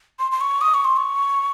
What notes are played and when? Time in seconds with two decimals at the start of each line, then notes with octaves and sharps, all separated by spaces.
0.19 C6
0.32 C6
0.41 C#6
0.61 D#6
0.74 C#6
0.85 C6
0.97 C#6